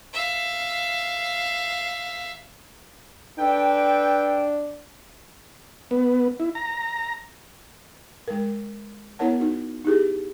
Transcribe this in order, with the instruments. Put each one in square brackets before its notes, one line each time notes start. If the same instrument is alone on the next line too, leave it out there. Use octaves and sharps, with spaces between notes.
[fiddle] E5 F5
[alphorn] D4 [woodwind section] A4 B4 G5
[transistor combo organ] B3
E4
A#5
[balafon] G#3 A#4
B3 E4 A#4 C#5 F#5 A5
D#4 F#4
D#4 E4 G4 G#4